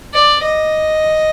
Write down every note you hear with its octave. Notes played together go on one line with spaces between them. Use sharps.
D5
D#5